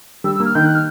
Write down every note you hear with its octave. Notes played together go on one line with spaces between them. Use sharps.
G3 E6
E6
A#3
F6
D#3 G6
F#6
F6